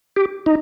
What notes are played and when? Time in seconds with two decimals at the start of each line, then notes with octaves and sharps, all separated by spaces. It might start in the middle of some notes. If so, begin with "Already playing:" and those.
0.17 G4
0.46 D#4